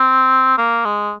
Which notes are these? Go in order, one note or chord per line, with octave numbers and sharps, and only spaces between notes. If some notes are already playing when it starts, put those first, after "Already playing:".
Already playing: C4
A#3
G#3